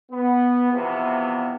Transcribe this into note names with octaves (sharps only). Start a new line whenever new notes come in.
B3
E2 C3 F3 B3